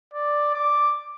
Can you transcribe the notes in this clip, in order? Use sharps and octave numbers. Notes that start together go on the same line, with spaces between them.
D5
D6